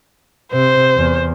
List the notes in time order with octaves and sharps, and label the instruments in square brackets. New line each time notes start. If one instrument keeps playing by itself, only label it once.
[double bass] C3 [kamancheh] C5
[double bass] E2